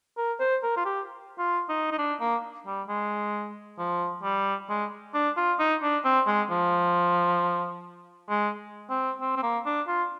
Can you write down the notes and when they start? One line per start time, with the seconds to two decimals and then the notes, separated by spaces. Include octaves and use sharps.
0.17 A#4
0.40 C5
0.63 A#4
0.77 F4
0.85 G4
1.38 F4
1.69 D#4
1.91 D#4
1.98 D4
2.20 A#3
2.66 G3
2.88 G#3
3.79 F3
4.23 G3
4.69 G#3
5.14 D4
5.37 F4
5.59 D#4
5.82 D4
6.04 C4
6.27 G#3
6.50 F3
8.29 G#3
8.90 C4
9.21 C4
9.36 C4
9.43 A#3
9.66 D4
9.87 F4